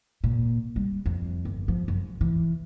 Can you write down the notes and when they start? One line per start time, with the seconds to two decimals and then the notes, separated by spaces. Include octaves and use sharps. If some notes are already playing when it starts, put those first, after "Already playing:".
0.24 A#2
0.76 G3
1.06 F2
1.45 G1
1.68 F3
1.88 F#2
2.21 E3